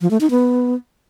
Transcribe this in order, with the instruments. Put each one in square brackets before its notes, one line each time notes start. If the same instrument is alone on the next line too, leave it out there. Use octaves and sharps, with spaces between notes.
[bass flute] F3
A3
D#4
B3